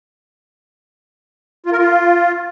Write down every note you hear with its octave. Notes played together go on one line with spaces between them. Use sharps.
F4
A#4
F4